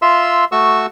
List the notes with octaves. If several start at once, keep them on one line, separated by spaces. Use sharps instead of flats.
F4 E5 C6 E6
A3 F#4 C#6 E6